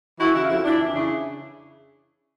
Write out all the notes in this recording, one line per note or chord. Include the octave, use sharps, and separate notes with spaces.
E3 E4 F#4
C#3 E4 F#4
F4
F2 E4 F#4
F2 D4 E4
E3
C#3 D4 E4